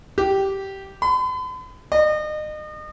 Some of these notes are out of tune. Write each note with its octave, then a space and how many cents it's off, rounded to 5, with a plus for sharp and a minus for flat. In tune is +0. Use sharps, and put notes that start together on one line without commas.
G4 -10
B5 +45
D#5 -35